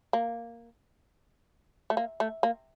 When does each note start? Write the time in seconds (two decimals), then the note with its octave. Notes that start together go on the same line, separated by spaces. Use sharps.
0.13 A#3
1.90 A3
1.97 A#3
2.20 A3
2.43 A#3